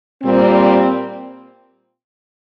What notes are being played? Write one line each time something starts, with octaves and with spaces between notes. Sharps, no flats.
A#2 G3 C4